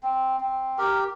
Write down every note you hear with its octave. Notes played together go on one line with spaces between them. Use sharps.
C4
C4
G4 A#4